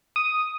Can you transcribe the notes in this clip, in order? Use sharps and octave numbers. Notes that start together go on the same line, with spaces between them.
D#6